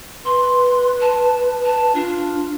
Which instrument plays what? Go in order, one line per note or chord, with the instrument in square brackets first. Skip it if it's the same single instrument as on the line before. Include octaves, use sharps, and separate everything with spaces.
[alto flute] B4 [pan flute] C6
[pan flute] A5
A5
[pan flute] D4 [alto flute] F4